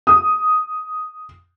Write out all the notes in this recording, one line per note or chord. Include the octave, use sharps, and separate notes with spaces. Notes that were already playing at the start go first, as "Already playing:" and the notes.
D#6